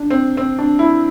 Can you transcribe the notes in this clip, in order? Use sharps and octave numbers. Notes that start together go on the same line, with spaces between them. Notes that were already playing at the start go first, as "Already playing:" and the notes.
Already playing: D4
C4
C4
D4
E4